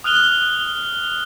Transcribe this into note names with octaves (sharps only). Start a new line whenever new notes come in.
D#6 F6 F#6 F7 G7